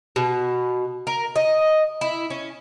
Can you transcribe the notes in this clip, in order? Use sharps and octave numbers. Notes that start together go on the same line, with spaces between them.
B2
A#4
D#5
E4
C#4